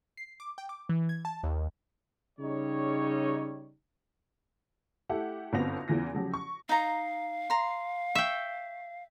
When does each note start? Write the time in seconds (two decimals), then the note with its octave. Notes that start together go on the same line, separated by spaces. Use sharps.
0.17 C7
0.40 D6
0.58 G5
0.69 D6
0.89 E3
1.09 G#6
1.25 A5
1.43 D#2
2.40 C#3 G3 D#4 C#5
5.09 A3 E4 G4 F#5
5.53 G1 F#2 B3 C4 A#6 F7
5.88 E2 C#3 E3 F4 A#6
6.13 C#3 F3 F#3 G4
6.34 C#6
6.69 D#4 F5 A#5
7.50 A#5 C6
8.15 E5 G5 C#6